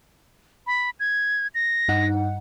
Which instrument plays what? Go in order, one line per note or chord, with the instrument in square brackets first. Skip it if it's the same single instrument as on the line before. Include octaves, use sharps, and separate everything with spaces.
[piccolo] B5
G#6
A#6
[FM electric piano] G2 D#4 F#5